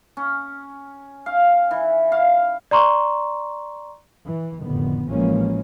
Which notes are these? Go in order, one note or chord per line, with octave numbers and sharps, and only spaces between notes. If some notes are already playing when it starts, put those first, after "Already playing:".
C#4
F5
E3
F5
D5 A#5 C6 C#6
E3
F1 A2 D3 D#3 B3
A1 E3 F3 G#3 A#3 C#4